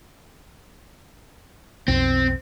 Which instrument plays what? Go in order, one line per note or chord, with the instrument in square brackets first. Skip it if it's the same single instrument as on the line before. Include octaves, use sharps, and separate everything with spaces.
[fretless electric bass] B1 F2 [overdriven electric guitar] C4